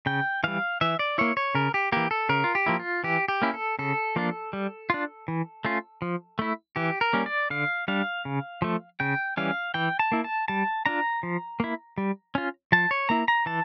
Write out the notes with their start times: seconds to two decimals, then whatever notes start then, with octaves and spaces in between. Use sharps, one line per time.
0.06 C#3 G5
0.44 E3 G3 F5
0.81 E3 E5
0.99 D5
1.18 A#3 E4 C#5
1.37 C#5
1.55 C#3 A#4
1.74 G4
1.92 E3 A#3 G4
2.11 A4
2.29 C#3 A#4
2.44 F4
2.55 G4
2.66 F3 A#3 E4
2.79 F4
3.04 E3 G4
3.28 G4
3.42 A#3 C#4 E4
3.54 A4
3.79 C#3 A4
4.16 F3 A#3 D4 F4
4.53 G3
4.90 D4 F4
5.28 E3
5.65 A3 C#4 F4
6.02 F3
6.39 A3 E4
6.76 E3 G4
7.01 A#4
7.13 G3 A#3 C#4
7.26 D5
7.50 D3 F5
7.88 G3 D4 F5
8.25 C#3
8.62 F3 A3
9.00 C#3 G5
9.37 E3 G3 C#4 F5
9.74 E3 G5
9.99 A5
10.12 A#3 E4
10.24 A5
10.48 G3 A5
10.86 D4 F4 A#5
11.23 F3
11.60 A#3 E4
11.98 G3
12.35 C#4 F4
12.72 F3 A5
12.91 C#5
13.09 A#3 E4 A#5
13.28 A#5
13.46 E3 A5